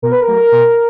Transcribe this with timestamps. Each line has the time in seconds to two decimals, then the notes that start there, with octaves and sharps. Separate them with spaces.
0.02 B2 A#4
0.11 B4
0.21 A#4
0.27 F#3 A3
0.52 B2